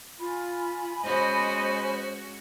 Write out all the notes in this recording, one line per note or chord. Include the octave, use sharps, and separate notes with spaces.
F4 G#5 B5
G#3 C#4 F#4 C5 D#5